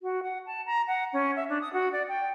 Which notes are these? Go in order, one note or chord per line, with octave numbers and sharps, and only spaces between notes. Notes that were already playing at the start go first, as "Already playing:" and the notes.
F#4
F#5
A5
A#5
F#5
C#4
E5
D4
D#6
F#4
D5
G5